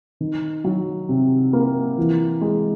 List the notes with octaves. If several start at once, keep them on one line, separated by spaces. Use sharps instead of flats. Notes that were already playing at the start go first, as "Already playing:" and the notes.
D#3
F#3
C3
A#3
E3
G#3